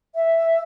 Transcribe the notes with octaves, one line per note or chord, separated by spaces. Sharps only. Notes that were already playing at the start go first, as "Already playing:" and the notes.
E5